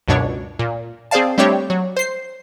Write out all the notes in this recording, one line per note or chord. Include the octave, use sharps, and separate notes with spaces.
C#2 F#2 B2 D4 C#5
A#2
C4 G#4 C5 D5 F5 A5
G3 A3 C4 D4 G4 C#5
F#3
C5 C7